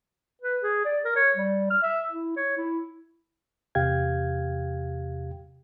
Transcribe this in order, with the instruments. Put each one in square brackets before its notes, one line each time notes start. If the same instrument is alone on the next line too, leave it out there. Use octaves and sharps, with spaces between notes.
[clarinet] B4
G#4
D5
A#4
C#5
G3
F6
E5
E4
C#5
E4
[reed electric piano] E2 C3 G4 F5 G5 G#6